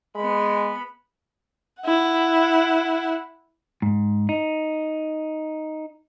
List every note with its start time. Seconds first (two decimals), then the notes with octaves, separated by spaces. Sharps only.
0.15 G#3 B3 B5
1.82 E4 F#5
3.82 G#2
4.29 D#4